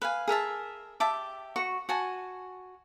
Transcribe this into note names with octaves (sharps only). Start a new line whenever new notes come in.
B4 F5 G#5
G#4 A#4 E5 A5
G4 E5 A5 D6
F#4 C#6
F#4 G#5 A5